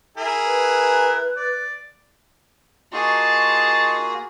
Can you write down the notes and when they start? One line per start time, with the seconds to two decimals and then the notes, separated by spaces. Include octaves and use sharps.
0.17 E4 G#4 A#4
0.45 B4
1.37 D5
2.93 A#3 D#4 F4 F#4 G#4 A5 C6 C#6